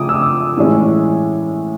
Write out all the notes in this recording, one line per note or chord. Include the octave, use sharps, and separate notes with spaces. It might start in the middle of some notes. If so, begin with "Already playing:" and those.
Already playing: C#3 F3 A3 D6 D#6
E6
A2 E3 G#3 C#4